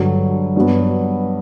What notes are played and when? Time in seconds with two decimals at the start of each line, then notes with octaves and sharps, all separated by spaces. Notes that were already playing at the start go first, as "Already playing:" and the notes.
Already playing: G2 D3 F#3
0.56 G2 F#3 B3